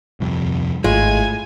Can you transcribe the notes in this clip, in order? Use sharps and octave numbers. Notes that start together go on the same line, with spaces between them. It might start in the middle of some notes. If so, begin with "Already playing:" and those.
D#1 C2 F2
G#1 A2 G#3 F4 G#5